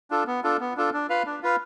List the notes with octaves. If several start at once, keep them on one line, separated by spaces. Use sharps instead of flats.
D4 F4 A4
B3
D4 F4 A4
B3
D4 F4 A4
D4
F4 B4 F5
D4
F4 B4 F5